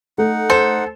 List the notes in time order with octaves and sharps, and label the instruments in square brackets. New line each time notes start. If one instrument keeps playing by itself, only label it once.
[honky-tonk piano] A3 [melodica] D#4 F#5
[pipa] A4 [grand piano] C5